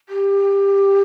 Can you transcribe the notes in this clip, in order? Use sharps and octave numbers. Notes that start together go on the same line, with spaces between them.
G4